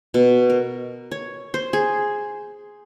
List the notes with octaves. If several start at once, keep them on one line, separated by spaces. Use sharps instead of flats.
B2
A#4
C#5
C5
G#4